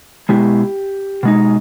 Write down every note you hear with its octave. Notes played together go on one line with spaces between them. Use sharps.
B2 G#3 B3 E4 G4
B2 G#3 D#4